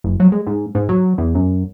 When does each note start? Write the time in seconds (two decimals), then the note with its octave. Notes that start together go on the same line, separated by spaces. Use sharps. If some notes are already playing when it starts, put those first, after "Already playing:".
0.04 F#1
0.20 F#3
0.32 G#3
0.47 G#2
0.75 G#2
0.89 F#3
1.18 E2
1.35 F#2